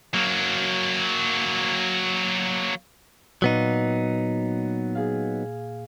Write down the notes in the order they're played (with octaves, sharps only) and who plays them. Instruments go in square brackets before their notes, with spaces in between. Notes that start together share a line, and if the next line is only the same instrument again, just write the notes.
[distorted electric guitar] F#3 A#3
[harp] A#2 [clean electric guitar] F#3 B3 D#4
[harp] G#4 F5